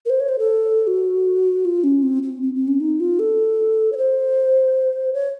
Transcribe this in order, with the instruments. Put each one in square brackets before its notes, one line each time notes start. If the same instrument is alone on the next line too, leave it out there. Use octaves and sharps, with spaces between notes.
[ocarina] A#4
C5
C#5
C5
A4
F#4
F4
C#4
C4
C4
C4
C4
C#4
D#4
F4
A4
C#5
C5
C#5